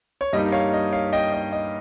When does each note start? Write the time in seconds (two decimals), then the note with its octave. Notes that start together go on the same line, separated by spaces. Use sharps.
0.21 C#5
0.33 G2 G3 A#3 D#4 D#5
0.52 C#5 F5
0.73 D#5
0.92 C#5 F5
1.12 D#5 G5
1.33 D#5
1.52 D#5